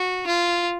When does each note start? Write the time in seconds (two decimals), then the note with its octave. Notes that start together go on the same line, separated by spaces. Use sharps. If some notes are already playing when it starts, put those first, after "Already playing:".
Already playing: F#4
0.27 F4